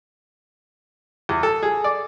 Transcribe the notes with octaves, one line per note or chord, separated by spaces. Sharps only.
E2
A4
G#4
D5